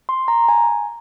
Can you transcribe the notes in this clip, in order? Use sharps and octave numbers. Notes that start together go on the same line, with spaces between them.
C6
A#5
G#5